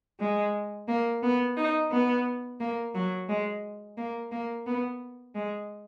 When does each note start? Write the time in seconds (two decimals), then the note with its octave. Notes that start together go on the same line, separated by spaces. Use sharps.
0.19 G#3
0.88 A#3
1.22 B3
1.57 D#4
1.91 B3
2.60 A#3
2.95 F#3
3.29 G#3
3.97 A#3
4.31 A#3
4.66 B3
5.35 G#3